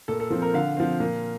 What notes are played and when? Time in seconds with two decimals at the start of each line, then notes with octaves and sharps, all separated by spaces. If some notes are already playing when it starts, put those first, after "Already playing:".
0.08 A#2 A4
0.20 A4
0.30 F3 C4
0.42 A#4
0.54 D3 F5
0.77 F3 C4
1.00 A#2